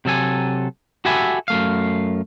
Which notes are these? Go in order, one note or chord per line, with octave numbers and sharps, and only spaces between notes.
C3 F#3 A4 G#5
F#4 G4 A4 E5 G#5 B5
F#2 A3 F5